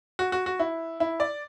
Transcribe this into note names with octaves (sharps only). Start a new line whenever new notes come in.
F#4
F#4
F#4
E4
E4
D5